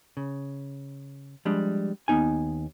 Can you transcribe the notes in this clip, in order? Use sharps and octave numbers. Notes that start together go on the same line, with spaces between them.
C#3
F3 G3 G#3 D4
D#2 G#2 B3 D#4 G#5